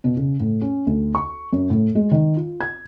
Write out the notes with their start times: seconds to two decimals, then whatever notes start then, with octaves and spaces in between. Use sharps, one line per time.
0.04 B2
0.17 C#3
0.40 A2
0.61 C#4
0.87 D2
1.15 C#6
1.53 F#2
1.70 A2
1.95 G#3
2.11 D#3
2.36 F4
2.61 G#6